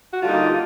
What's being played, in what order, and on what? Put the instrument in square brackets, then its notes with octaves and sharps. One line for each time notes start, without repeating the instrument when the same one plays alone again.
[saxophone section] F#4
D3 G3 A#3 D#4 F4